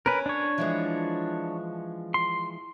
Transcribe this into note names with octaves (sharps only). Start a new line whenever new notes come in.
C#4 A#4 B4
D4 C#5
E3 F3 G#3
C6